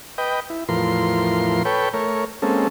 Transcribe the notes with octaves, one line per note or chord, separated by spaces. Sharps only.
B4 D#5 G5
E4
E2 A2 F3 A#4 C6
A4 B4 C#5 G5
A3 A#4 C#5
G#3 A#3 C4 C#4 A4